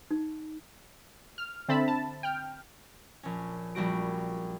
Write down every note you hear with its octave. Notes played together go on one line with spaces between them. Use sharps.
D#4
F6
D3 C4 E5 A5 B5
A5
G5 F6
A#1 C#4
A#1 G3 F#4 D7